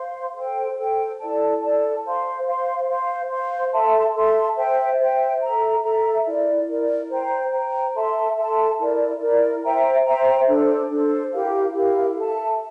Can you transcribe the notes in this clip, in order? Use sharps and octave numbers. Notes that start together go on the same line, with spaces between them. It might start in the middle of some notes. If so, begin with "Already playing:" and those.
Already playing: C5 F5 C6
A4 C5 G5
A4 C5 G5
E4 A4 D5 A5
E4 A4 D5 A5
C5 F5 C6
C5 F5 C6
C5 F5 C6
C5 F5 C6
A4 E5 A5 C6
A4 E5 A5 C6
C5 E5 G5
C5 E5 G5
A4 E5 A#5
A4 E5 A#5
E4 A#4 D5
E4 A#4 D5
C5 G5 A#5
C5 G5 A#5
A4 E5 A5 C6
A4 E5 A5 C6
E4 A#4 D5
E4 A#4 D5
C5 E5 G5 A#5
C5 E5 G5 A#5
D4 A4 C5
D4 A4 C5
E4 G4 A#4 F5
E4 G4 A#4 F5
A4 E5 A5